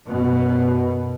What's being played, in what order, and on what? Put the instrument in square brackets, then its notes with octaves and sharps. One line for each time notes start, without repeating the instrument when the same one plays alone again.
[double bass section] F#2 B2